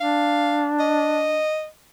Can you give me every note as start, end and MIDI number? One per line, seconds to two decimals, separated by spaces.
0.01 1.46 62
0.01 0.70 77
0.80 1.67 75